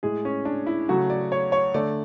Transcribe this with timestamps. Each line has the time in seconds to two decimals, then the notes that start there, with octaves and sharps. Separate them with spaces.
0.03 A2 G#3 G#4
0.25 C#4
0.45 D4
0.66 E4
0.89 C#3 F#3 A3 F#4
1.10 D5
1.32 C#5
1.52 C#5
1.74 D3 A3 D5